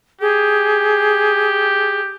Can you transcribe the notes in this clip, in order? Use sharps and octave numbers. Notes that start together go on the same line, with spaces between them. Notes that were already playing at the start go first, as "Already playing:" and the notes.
G4 G#4